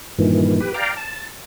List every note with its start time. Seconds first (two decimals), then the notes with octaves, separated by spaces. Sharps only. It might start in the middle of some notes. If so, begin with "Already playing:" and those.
0.18 G2 A#2 D#3 E3
0.61 G4 B4
0.74 D5 F5 G5 A#5
0.97 A5